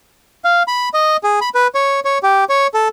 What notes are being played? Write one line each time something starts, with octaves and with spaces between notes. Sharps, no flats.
F5
B5
D#5
G#4
B5
B4
C#5
C#5
G4
C#5
A4